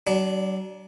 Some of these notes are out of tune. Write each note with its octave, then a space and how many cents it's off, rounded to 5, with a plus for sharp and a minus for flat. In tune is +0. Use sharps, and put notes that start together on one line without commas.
F#3 +40 D4 +0